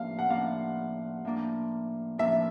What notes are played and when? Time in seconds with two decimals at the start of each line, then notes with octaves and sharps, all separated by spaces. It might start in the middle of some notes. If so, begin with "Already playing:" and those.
Already playing: A2 F3 A#3 D4 F5
0.19 F#5
0.29 A2 F3 A#3 D4 F5
1.25 A2 F3 A#3 D4
2.18 A2 F3 A#3 D4 E5